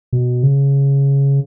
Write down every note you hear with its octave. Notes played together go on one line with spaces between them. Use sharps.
B2
C#3